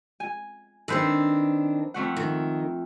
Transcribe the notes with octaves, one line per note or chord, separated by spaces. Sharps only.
G#5
D#3 C4 D4 A4 B4 C5
F2 A3 F#5
D#3